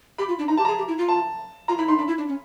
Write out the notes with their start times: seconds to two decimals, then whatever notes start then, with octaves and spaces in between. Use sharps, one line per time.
0.18 G4 B5
0.29 F4
0.39 D4
0.48 D#4 A#5
0.57 G4 A5
0.65 G#4 A#5
0.78 G4
0.88 E4
0.98 F4
1.08 A5
1.68 F4 A#5
1.78 E4 B5
1.88 D#4 C6
1.98 D4 B5
2.08 E4
2.18 D4
2.28 C#4